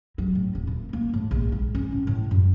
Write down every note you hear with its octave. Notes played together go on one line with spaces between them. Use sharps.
F#3
A2
D#1
A#2
A#3
A2
A#1
G#2
C#4
A2
A2
F#2